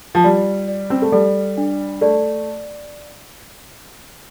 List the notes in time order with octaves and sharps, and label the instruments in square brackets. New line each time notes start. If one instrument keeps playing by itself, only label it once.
[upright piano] F3
[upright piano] G3 [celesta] F4
[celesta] D5
[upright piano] C4
A3
[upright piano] G3 [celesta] A4
[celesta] D4
[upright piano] A3 [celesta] D5